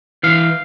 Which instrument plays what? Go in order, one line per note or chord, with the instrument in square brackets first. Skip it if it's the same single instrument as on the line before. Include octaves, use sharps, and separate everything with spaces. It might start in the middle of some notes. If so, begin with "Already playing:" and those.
[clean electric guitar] E3 F5